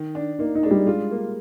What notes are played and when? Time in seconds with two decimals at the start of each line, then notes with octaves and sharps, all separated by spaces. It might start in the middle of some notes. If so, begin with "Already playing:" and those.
Already playing: D#3
0.15 D4
0.39 A#3 D#4
0.55 D#4
0.63 G#3 D4
0.71 G3
0.86 G#3 F4
1.11 A#3